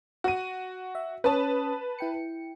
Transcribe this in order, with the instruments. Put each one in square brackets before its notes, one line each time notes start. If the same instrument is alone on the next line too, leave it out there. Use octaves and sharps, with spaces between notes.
[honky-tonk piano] F#4 D#7
[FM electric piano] E5
[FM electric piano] C#4 C#5 D#6 [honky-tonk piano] B4 A5
[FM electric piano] E4 G5 C#7